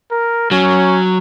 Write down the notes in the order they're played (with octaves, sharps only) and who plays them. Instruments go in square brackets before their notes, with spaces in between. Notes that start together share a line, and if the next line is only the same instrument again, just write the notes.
[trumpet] A#4
[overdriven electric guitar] F#3 [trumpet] C#4